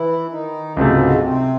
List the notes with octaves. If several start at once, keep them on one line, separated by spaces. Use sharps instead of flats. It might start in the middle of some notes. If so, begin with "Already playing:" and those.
Already playing: E3 E4
D#3 D#4
C#2 G#2 C3 F#3 G#3 A3
C3 C4